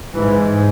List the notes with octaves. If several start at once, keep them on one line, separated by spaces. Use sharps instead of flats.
G#2 E3